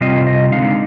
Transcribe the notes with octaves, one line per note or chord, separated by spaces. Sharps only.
C3 G3 C4 F4 D#5
D#5
D3 G#3 D#4 F5